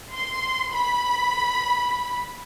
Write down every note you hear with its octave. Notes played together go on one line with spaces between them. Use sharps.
C6
B5